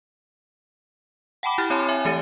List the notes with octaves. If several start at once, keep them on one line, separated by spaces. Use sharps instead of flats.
F#5 G5 A5 B5 D6
E4 G4 B5 F6 A6
C4 C#5 G#5 A5 B5 C6
E5 G#5
E3 A3 G4 A6 C#7 D#7